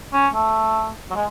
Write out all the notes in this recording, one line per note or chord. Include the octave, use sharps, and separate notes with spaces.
C#4
A3
F#3
G#3